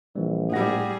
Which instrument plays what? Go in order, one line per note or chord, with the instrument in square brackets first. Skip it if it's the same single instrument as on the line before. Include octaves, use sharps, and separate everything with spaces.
[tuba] A#1 [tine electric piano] E3 G3
[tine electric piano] A2 F#5 A#6 [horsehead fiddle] G3 G#4